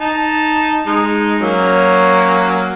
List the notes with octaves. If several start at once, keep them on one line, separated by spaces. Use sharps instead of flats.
D#4 A5
G#3 D#4
F#3 A#3 C#4